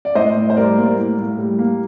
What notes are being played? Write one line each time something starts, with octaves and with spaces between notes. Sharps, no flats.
D5
A2 C5 D#5
A2
C5
G3 A#4 D5
A#3
A2
A2
G3
A#3